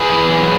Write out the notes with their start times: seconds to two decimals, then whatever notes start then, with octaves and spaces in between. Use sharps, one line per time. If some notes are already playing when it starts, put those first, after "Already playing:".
Already playing: G#4 B4
0.09 E3
0.29 F#3